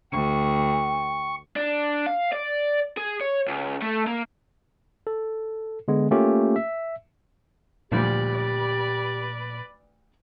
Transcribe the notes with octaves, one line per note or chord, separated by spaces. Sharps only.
D2 G5 C#6
D4
F5
D5
G#4
C#5
C#2
A3
A#3
A4
D3 G#3 B3
A3 A#3 C#4 F4 G4 A#4
E5
D2 A#2 F3 G3 G4 B4 D5